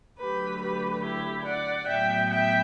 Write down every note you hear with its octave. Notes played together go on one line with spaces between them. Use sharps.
D3 F#3 A3 G4 B4
G4 B4
E4 G4
D5 F#5
A2 F#3 B3 E5 G5
E5 G5